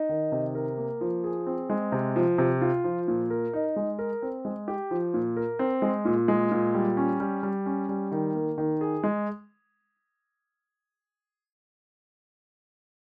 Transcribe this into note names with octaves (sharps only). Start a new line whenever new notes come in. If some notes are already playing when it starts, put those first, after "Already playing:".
Already playing: D#4
D#3
C3
A#4
A#3
F3
G#4
C4
G#3
C3
F3
C3
F4
F3
A#2
A#4
D#4
G#3
A#4
C4
G#3
G4
F3
A#2
A#4
C4
G#3
A#2
G#3
A#2
G3
C#4
G3
G3
C#4
G3
D#3
A#3
D#3
G#4
G#3